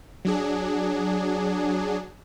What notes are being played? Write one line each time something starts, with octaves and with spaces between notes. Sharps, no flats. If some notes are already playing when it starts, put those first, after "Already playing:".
F#3 D4 G#4